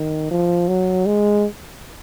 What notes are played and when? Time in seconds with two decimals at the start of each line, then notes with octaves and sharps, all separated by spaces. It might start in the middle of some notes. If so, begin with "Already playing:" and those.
Already playing: D#3
0.31 F3
0.68 F#3
1.06 G#3